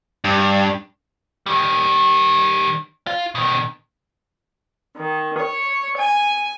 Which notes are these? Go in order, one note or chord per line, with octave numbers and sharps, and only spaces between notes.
G2
D#3 G3
F4
B2 D#3
D#3
C#5
G#5